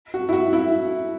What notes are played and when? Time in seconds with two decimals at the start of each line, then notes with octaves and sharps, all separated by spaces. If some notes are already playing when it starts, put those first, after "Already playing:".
0.14 F#4
0.29 E4
0.33 F#4
0.53 E4